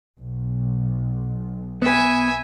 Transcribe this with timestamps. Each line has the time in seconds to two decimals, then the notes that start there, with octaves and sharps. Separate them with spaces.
0.20 B1
1.82 B3 B4 E5 G#5